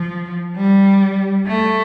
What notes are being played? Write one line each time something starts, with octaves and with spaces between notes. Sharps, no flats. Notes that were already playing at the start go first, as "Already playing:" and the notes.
Already playing: F3
G3
A3